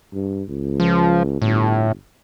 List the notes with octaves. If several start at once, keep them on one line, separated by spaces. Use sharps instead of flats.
G2
C#2
F3
G1 A2